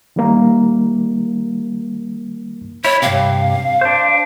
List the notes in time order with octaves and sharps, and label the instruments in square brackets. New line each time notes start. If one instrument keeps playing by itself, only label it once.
[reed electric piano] D#3 G3 A#3 A#4
[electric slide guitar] E4 [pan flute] C#5
[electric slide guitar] G2 C3 [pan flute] F5
[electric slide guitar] D4 C5